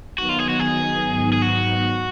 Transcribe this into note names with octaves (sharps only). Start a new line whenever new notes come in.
D#3 F#3 B3 D#4 F#4
F4
G#4
F#4
G#4
G#2 D#3 F#3 B3 D#4
G#4
F#4